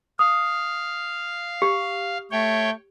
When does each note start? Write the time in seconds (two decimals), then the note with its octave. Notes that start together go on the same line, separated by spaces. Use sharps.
0.19 F5 D#6
1.62 G4
2.32 A3 C#5 G5